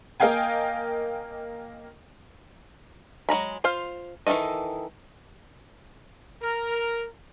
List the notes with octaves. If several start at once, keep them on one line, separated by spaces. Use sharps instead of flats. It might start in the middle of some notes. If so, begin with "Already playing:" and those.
A#3 A#4 D#5 F5 G5 G#5
F#3 G#3 A#5 B5
F4 C5 F5
D#3 E3 F#3 A4 D#5
A#4